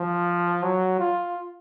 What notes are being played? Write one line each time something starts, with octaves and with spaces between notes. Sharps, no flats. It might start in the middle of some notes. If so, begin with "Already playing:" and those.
Already playing: F3
F#3
F4